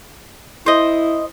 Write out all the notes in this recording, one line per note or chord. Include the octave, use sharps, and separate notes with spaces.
E4 C5 D#5